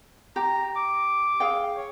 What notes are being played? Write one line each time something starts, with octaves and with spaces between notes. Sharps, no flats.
G4 A#5
D6
G#4 F5 G5
C#5